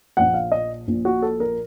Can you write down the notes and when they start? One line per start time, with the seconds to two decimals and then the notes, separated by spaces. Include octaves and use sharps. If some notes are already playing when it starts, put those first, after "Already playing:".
0.17 A#1 A#2 F3 F#5
0.34 F5
0.52 D#5
0.88 A#1 A#2 F3
1.05 F#4
1.22 A4
1.40 A#4